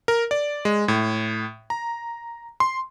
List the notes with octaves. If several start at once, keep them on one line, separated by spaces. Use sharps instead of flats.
A#4
D5
G#3
A2
A#5
C6